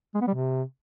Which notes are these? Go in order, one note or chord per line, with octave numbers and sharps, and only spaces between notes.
G#3
B3
G3
C3